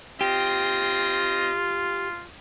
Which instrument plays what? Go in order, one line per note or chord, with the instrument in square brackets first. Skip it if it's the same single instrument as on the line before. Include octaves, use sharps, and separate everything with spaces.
[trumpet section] C4 D#5 [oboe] F4 [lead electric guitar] G4